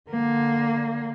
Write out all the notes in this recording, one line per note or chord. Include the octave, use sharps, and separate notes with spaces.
D3 A#3